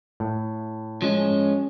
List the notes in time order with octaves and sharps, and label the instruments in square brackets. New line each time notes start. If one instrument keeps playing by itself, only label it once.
[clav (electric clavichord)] A2
[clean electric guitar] F3 G#3 [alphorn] C#4